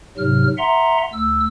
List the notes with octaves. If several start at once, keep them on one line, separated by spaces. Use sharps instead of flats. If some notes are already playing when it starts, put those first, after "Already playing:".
G#2 C3 F#3 F6
E5 F#5 A#5 C6
D2 E6